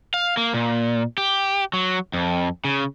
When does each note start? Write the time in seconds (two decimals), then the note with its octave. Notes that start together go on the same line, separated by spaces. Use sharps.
0.14 F5
0.37 A#3
0.54 A#2
1.18 G4
1.73 F#3
2.13 F2
2.65 C#3